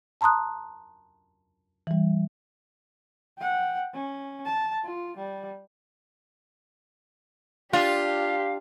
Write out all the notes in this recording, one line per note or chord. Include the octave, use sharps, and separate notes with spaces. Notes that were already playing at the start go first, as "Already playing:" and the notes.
A5 A#5 C6 D#6 F#6
E3 G3
F#5 G5
C#4
A5
F4
G3
D4 F4 G4 F5